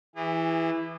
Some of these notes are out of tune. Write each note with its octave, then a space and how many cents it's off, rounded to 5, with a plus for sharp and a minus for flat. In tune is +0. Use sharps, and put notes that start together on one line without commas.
E3 +0 G#4 -35